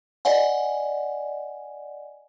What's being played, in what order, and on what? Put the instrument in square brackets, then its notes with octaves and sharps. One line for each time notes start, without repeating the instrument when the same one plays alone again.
[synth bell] D5 D#5 F#5 G#5